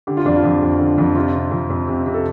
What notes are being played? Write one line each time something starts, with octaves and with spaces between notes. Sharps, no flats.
D3 G4
F4
F2 D4
F4
F2
F2
D3
F2
C3 F4
C3
F2
F2
C3
C3
A4